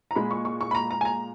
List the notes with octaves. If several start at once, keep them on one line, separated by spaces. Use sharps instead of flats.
A#5
A#2 G#3 B5
C#6
C#6
C#6
B5
A#5
A#5
G#5
A#5